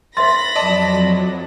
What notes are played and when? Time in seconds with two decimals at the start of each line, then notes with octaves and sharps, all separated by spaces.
0.17 C5 E5 B5 C6 A6 A#6
0.56 F2 F#3 D5 D#5 A5